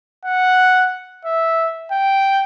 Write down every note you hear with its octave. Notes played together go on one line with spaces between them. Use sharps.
F#5
E5
G5